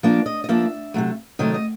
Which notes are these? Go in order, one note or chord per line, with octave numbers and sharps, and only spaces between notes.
F3 A#3 D4 D5
D#5
D#5
F3 A#3 D4 E5
C3 D#3 F#3 A3
C3 D#3 F#3 A3 D#5
D#5